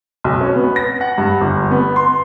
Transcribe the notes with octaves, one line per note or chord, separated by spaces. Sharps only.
B1
C#4
B3
A#6
F#5
G2
G1
B3
C6